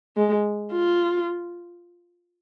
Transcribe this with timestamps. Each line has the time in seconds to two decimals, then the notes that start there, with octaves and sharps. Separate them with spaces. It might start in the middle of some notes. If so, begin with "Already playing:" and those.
0.16 G#3
0.72 F4